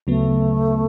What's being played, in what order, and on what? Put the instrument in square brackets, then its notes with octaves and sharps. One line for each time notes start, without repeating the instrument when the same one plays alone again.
[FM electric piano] D2 C#3 F#3 B3 [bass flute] A3